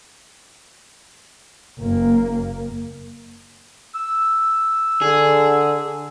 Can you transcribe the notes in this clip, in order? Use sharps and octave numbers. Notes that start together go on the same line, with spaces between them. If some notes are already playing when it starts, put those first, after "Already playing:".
F#1 A#3
E6
D3 G#4